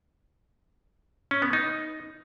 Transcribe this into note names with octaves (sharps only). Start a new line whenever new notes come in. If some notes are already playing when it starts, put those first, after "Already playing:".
C#4
B3
D#4